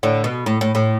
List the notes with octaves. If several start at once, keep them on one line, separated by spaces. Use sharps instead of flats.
A2 D3
B2
A2
A2
A2